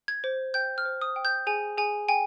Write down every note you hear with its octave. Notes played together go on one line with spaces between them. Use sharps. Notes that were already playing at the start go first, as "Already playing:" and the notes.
G#6
C5
G5 G6
F6
C5
D#6
G5
G6
G#4 G#5
G#4 G#5
G5 G#5